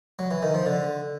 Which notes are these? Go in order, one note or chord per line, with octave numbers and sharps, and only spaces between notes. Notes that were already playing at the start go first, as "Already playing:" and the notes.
F#3
E3
D#3
F3
D3